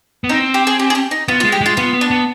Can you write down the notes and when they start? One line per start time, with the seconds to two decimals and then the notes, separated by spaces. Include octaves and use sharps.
0.24 B3
0.29 C4 D#4
0.54 G4
0.67 G#4
0.79 G4
0.90 G#4
0.95 G4
1.11 D#4
1.28 B3 F4
1.40 F4
1.44 G#3
1.52 G4
1.61 G#3 F4
1.77 B3 F4
1.93 B3
2.01 D4
2.11 B3